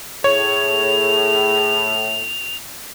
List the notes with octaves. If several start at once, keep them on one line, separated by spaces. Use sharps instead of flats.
A2 G#4 C#5 F7